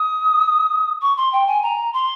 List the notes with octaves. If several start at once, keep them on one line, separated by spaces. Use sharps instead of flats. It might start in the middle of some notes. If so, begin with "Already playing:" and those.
Already playing: D#6
C#6
C6
G5
G#5
A#5
C6